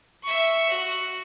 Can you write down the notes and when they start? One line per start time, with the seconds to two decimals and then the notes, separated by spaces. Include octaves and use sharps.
0.23 E5 C#6
0.69 F#4